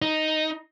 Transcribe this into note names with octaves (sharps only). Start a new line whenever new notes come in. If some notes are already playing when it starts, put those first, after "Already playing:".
D#4